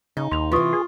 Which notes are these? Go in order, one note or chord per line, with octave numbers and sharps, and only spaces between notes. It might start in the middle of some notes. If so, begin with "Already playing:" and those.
C#3 D#4
D#2 C6 F7
C3 E3 F4 C6 C#6 D#6
G#4